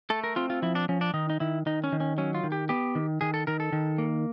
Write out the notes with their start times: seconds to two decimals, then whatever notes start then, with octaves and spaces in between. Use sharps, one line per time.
0.10 A3 A4
0.24 A#4
0.36 C4 F4
0.50 F4
0.62 F3 E4
0.75 D4
0.89 F3 C#4
1.01 D4
1.14 D#3 D#4
1.30 D#4
1.40 D#3 E4
1.66 D#3 D#4
1.84 C#4
1.92 D#3
2.00 C#4
2.18 F#3 C#4
2.35 F4
2.44 D#3
2.52 G4
2.69 B3 G4
2.95 D#3
3.21 D#3 G#4
3.34 A4
3.47 D#3 A#4
3.60 A4
3.73 D#3
3.98 A#3